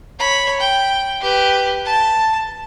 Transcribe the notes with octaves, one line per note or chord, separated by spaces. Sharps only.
C#5 B5
G5
G4 B4
A5